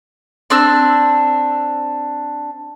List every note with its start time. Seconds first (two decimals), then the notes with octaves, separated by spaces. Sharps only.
0.50 C4 D4 E6